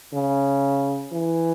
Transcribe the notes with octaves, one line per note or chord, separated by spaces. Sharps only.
C#3
E3